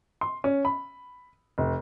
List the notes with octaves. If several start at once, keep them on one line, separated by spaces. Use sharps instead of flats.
C6
C#4
B5
F1